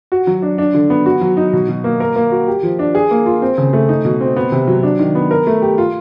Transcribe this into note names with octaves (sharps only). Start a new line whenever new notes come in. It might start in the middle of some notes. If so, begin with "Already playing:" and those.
F#4
F#3
D4
D4
D3
B3
F#4
F#3
D#4
B2
B2
A#3
A#4
A#3
F#4
G4
F3
D4
G#4
A#3
F4
C4
C#3
A3
D#4
B2
C4
B3
C3
F#3
D4
D#3
B3
A#4
A3
G4
F4